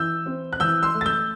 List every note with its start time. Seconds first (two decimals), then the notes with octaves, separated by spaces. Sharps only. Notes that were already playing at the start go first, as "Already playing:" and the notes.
Already playing: E3 E6 G6
0.26 C4
0.53 F#6
0.60 E3 E6 G6
0.83 C6 E6
0.94 A3
1.01 A6
1.06 E6 G6